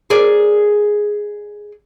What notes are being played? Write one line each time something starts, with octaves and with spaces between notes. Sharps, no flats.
G#4 A#4 D5